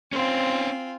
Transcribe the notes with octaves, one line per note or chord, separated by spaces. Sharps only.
C4 C#4 F4 C5 G#5